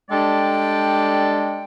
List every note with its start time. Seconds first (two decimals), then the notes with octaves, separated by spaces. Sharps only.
0.10 G3 G#3 D4 A4 D5 G5